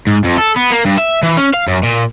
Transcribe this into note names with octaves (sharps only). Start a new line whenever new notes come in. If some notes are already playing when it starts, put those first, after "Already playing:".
G#2
F2
A4
B3
A#3
G2
E5
E3
C#4
F5
F#2
A#2